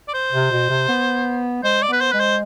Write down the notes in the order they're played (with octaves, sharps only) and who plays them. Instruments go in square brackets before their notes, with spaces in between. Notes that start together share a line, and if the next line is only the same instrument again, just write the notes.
[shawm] D5
C5
[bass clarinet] C3
B2
C3
B3
[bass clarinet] G#3 [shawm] C5
[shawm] D5
[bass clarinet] B3 [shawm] B4
[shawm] C5
[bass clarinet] G#3 [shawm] B4
[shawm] C5